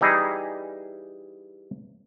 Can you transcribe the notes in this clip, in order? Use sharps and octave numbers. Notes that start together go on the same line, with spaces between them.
E3 G3 D#4 E4 G#4